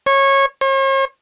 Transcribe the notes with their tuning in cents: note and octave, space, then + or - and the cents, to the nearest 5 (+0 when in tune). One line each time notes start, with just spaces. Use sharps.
C#5 -20
C#5 -45